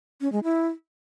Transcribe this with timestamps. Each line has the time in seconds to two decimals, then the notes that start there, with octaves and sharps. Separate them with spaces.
0.21 C#4
0.32 G#3
0.44 E4